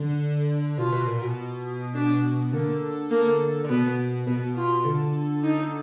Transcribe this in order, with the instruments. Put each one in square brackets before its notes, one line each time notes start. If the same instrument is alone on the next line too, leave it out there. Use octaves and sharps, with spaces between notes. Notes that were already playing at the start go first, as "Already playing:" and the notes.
Already playing: [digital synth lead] D3
[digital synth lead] B2 [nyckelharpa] F4
[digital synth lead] B2
A#2
B2
[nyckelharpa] D4
[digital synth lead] D3 [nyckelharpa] A#3
[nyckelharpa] A#3
[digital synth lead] D3
[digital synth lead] B2 [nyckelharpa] B3
[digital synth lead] B2 [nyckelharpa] B3
[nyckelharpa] F4
[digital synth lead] D3
[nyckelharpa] D#4